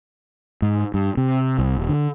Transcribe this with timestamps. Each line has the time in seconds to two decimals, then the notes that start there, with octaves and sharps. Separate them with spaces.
0.62 G#2
0.94 G2
1.17 C3
1.59 C2
1.77 D#1
1.89 D3